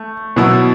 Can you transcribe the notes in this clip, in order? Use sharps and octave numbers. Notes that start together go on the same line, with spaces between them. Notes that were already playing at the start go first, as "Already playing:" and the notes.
Already playing: A3
B2 F#3 B3 E4